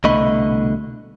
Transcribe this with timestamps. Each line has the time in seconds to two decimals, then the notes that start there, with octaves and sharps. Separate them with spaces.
0.04 C2 B2 D3 A3 D#5 B5